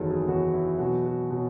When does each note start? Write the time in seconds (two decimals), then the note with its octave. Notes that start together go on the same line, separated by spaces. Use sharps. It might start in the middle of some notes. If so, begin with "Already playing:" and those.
Already playing: F#1 E2 D#3 F#3 G#4 A4
0.10 G#4
0.28 F#1 E2 D#3 F#3 F#4
0.54 E4
0.79 E2 B2 F#3 F#4
1.05 F#4
1.31 B2 F#3